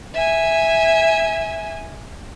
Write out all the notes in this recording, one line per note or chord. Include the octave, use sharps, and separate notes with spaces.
E5 G#5